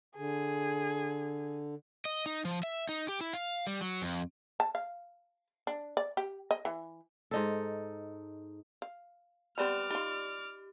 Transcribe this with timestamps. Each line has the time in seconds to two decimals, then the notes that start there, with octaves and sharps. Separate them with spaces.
0.17 D3 G#4
2.05 D#5
2.26 D#4
2.45 F3
2.63 E5
2.89 D#4
3.08 G4
3.21 E4
3.33 F5
3.67 G3
3.81 F#3
4.02 F2
4.60 A5
4.75 F5
5.67 D4
5.97 D5
6.17 G4
6.51 D#5
6.65 E3
7.31 G#2 D#4 A4
8.82 F5
9.58 G3 B3 C4 G4 D5 B5 D6 F6
9.90 D#4 F4 G4